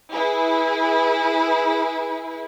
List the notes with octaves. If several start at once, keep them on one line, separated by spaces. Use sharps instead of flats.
E4 G#4 B4